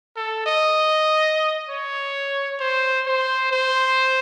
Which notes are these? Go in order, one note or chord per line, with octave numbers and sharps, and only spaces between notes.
A4
D#5
C#5
C5
C5
C5